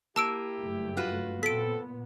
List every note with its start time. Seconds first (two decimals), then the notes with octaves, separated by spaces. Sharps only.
0.16 A#3 E4 G4 A5 E6 D7
0.59 F#1 G2 A3
0.97 F4 F#4 B4
1.43 A#2 B3 C4 A4 B6 D7